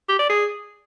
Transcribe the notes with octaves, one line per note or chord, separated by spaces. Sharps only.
G4
D5
G#4